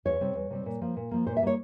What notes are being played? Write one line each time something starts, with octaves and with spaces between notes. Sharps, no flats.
E2 C#5
C3 G3 C4
E2
C3 G3 C4
A#2
F3 A#3
A#2
F3 A#3
A#2 C5
E5
G3 A#3 C#5